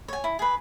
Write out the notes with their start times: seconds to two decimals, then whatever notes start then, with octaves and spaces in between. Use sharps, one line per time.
0.08 C#5 G#5
0.24 E4
0.39 G#4 B4